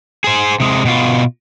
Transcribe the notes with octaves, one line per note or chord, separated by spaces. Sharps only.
G#4 C5
C3 G#3
B2 F4